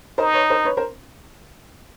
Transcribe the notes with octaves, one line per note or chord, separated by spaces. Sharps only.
D#4 A#4 C5
B4 C#5
A#4 C5
B4 C#5
A#4 C5